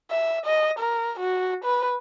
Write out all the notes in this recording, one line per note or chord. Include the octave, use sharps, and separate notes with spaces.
E5
D#5
A#4
F#4
B4